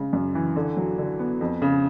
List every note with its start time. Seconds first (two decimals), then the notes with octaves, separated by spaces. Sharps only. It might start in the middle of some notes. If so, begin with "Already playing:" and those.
Already playing: C#3 G#3
0.13 F#2
0.35 E3
0.56 D3
0.77 F#3
0.98 D3
1.19 B3
1.41 F2
1.62 C#3